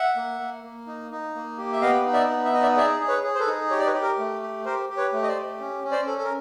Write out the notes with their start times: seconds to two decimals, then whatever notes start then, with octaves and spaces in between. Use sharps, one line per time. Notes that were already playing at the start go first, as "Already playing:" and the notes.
Already playing: E5 F#5
0.16 A#3
0.40 A#3
0.63 A#3
0.87 D#4
1.11 D#4
1.35 A#3
1.58 G4
1.73 E5
1.81 B3 D#5 F5
2.05 D#4
2.13 D5 E5
2.29 B3
2.45 E5
2.53 D#4 D#5
2.62 D5 E5
2.76 G#4 D5 E5
3.00 G#4
3.08 B4 C#5
3.23 G#4
3.35 C5
3.39 A4 B4
3.47 D#4
3.70 G4 C#5
3.79 D5
3.86 B4 C#5
3.94 G4
4.02 A#4
4.18 A3
4.42 G4
4.65 G4 A#4 C5
4.89 G4
4.97 B4 C#5
5.13 A3
5.23 D#5
5.28 C5 D5
5.36 G4
5.60 C#4
5.84 C#4
5.91 C5 D5
6.07 A4
6.18 A4
6.23 A#4